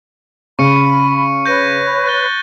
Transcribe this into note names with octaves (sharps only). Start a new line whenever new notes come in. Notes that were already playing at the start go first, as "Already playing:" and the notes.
C#3 B5 C#6 C#7 D#7
B4 C#5 G6 A#6 D#7
F#6 A6 G7